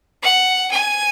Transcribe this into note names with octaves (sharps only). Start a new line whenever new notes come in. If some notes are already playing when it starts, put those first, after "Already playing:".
F#5
G#5